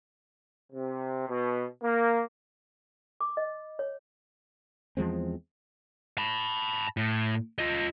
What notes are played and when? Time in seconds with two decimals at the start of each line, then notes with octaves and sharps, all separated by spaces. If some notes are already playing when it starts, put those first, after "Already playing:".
0.72 C3
1.29 B2
1.83 A#3
3.21 D6
3.37 D#5
3.79 C#5
4.97 E2 F3 G#3 C4
6.18 A5 B5
6.97 A2
7.59 F4 D#5